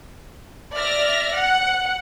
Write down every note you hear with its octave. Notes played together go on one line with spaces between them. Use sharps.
D5 E5 F6 A#6
F#5